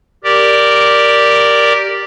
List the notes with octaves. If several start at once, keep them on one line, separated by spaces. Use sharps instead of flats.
G4 A#4 D5